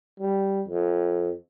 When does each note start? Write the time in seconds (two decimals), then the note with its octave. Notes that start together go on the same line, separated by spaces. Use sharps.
0.20 G3
0.68 F2